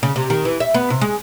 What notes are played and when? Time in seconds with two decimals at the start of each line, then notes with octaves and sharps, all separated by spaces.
0.03 C#3
0.16 C3
0.30 D#3
0.45 E3
0.60 E5
0.74 B3
0.90 C3
1.01 G#3